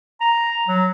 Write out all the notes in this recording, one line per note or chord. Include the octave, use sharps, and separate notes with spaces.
A#5
F#3